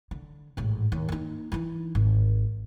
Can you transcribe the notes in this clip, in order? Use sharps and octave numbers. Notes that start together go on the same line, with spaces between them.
D3
A1 G#2
D#2
A#3 D#4
E3 D#4
G#1